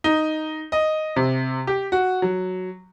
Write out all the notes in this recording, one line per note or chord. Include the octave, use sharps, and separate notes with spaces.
D#4
D#5
C3
G4
F#4
F#3